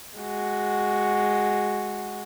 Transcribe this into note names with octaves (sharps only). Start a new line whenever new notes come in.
G#3 F#4